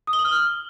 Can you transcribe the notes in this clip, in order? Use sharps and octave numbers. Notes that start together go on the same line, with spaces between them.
D#6
G7
F#7
F6